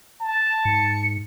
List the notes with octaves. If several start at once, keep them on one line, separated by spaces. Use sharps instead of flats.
A5
G#2 C#7